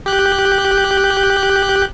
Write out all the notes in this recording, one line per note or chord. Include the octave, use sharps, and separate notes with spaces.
G4 F#6 G6